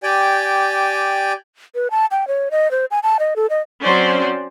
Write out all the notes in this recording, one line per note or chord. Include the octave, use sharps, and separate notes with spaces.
G4 D5 G5 G#5
B4
A5
G5
C#5
D#5
C5
G#5
A5
D#5
A4
D#5
F#3 C4 C#4 C5 D5